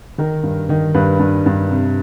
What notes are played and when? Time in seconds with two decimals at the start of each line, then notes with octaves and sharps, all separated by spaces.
0.18 D#3 A#4
0.43 G2
0.69 D#3
0.94 G2 B4
1.19 G2
1.46 G2
1.71 C3